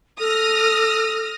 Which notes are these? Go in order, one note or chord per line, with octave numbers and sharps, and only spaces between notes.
A4 D#6 F6 A#6